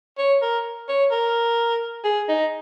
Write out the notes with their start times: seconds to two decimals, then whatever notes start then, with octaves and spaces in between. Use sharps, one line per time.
0.18 C#5
0.42 A#4
0.89 C#5
1.11 A#4
2.04 G#4
2.29 D#4